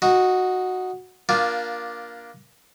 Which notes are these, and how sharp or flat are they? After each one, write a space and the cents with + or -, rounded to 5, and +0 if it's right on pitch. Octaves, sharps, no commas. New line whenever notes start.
D#4 +0 F#4 -5
A#3 +15 D4 +0 F4 +0